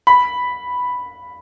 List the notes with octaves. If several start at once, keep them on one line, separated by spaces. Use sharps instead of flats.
B5